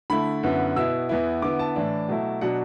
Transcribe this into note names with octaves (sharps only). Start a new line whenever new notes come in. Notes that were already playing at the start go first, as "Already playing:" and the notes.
D3 A3 E4 B5
F#2 D3 B3 E4
B2 B3 E4 E6
E2 E3 B3 E4
D3 B3 E4 D6
A5
A2 E3 D4
B2 F#3 A3 E4
B2 F#3 D4 F#5